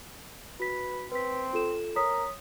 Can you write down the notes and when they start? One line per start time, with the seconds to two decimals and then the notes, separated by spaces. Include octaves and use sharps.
0.60 F#4 B4 B6
1.12 C4 B4 B6
1.53 F4 A4 E7
1.96 A#4 C#5 D#6 B6